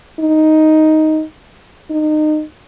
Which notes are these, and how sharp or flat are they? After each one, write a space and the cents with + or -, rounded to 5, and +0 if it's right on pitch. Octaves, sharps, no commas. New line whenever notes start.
D#4 +5
D#4 -25